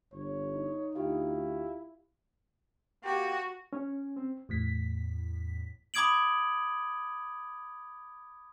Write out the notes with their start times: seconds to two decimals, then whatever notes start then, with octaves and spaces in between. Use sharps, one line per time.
0.13 G1 C#5
0.54 D#4
0.95 D2 E4 F4 G4 F5
3.04 A#3 F#4 G4
3.73 C#4
4.16 C4
4.49 E2 A2 B6
5.94 B5 D6 D#6 G#6 D7 F#7